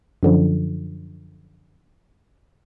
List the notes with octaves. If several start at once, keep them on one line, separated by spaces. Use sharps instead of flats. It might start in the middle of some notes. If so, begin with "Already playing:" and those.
F#2 D3 F3